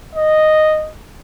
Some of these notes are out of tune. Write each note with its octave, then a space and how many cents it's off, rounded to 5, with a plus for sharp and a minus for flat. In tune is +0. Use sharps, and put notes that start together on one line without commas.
D#5 -5